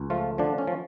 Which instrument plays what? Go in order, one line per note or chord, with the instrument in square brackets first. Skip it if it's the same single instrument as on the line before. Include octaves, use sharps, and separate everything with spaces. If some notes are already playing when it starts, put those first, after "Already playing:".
Already playing: [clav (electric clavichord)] C#2
F3 A3 F4
D3 F3 D4
C#4
F3